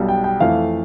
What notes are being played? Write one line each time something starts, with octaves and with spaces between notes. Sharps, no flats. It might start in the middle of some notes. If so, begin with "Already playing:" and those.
Already playing: B1 B2 G3
G5
G5
F2 E3 A3 F5